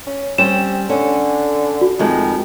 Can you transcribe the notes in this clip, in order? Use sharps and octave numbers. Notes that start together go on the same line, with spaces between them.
C#4
G3 C4 C#4 C5 E7
D3 C#4
F#4
F2 D#3 G#3